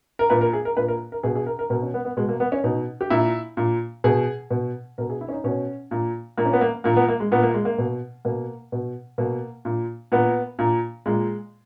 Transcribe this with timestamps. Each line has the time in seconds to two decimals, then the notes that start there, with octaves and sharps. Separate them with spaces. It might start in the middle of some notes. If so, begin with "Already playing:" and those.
0.19 A#4
0.30 A#2 B4
0.41 A#4
0.53 G#4
0.65 A#4
0.77 A#2 B4
0.88 A#4
1.12 A#4
1.23 B2 G#4
1.35 G#4
1.46 A#4
1.59 A#4
1.70 B2 A#4
1.82 C#4
1.94 B3
2.05 B3
2.17 B2 G#3
2.29 A#3
2.40 B3
2.52 C#4
2.64 B2 D#4
3.01 G4
3.10 A#2 E4
3.57 A#2
4.04 B2 G#4
4.51 B2
4.98 B2 A#4
5.10 G#4
5.21 E4
5.29 C#4
5.32 D#4
5.44 B2 C#4
5.91 A#2
6.37 A#2 A#3
6.46 C#4
6.53 B3
6.61 A#3
6.84 A#2 A#3
6.96 B3
7.08 A#3
7.20 G#3
7.32 A#2 B3
7.42 A#3
7.54 G#3
7.65 A#3
7.78 B2
8.25 B2 A#3
8.72 B2
9.18 B2 A#3
9.65 A#2
10.12 A#2 B3
10.59 A#2
11.06 A#2 G#3